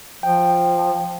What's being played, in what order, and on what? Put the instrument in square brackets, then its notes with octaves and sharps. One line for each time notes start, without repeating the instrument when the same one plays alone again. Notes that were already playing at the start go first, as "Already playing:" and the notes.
[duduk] F3 [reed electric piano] G5